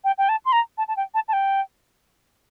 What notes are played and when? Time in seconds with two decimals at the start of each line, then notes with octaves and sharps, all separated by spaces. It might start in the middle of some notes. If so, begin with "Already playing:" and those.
0.04 G5
0.18 G5
0.29 A5
0.45 C6
0.52 A#5
0.78 A5
0.88 A5
0.97 G5
1.14 A5
1.28 A5
1.33 G5